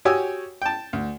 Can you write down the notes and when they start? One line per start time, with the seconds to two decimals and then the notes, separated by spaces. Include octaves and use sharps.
0.05 F#4 G4 C#5 G#5 D#6 E6
0.62 G5 A5
0.93 D2